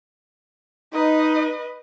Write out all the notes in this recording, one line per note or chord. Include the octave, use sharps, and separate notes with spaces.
D#4 B4 D#5